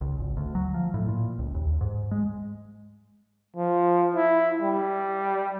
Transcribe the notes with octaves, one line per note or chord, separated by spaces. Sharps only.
C#2
G#1
D2
F#3
F3
A2
A#2
C#2
D#2
G#2
G#3
F3
E4
G3